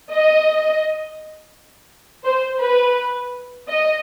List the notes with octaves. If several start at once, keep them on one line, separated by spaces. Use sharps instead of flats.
D#5
C5
B4
D#5